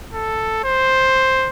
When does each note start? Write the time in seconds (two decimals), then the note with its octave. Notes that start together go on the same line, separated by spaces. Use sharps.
0.14 A4
0.64 C5